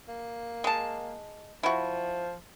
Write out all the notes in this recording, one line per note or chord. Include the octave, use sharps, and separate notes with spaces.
A#3
G#3 A5
F3 E4 F#4